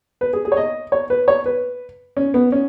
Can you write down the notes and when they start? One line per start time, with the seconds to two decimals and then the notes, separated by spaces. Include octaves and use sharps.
0.21 B4
0.33 G#4
0.45 G#4
0.52 C#5
0.57 D#5
0.92 C#5
1.10 B4
1.28 C#5
1.46 B4
2.17 C#4
2.34 B3
2.52 C#4